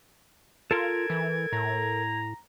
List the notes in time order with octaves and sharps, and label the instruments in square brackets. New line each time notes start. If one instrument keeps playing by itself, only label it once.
[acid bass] F4 [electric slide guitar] A4 A#4 [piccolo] G#6
[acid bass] E3
[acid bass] A2 [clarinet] A#5